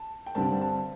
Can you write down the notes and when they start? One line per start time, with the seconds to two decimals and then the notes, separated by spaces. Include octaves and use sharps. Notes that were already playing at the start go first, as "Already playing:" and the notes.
Already playing: A5
0.26 G5
0.35 G2 D3 G3 C4 A5
0.61 A5